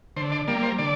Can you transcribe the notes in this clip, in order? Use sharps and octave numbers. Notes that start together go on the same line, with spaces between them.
D3 C5
D5
G3 A#3 D5
C5
D3 D5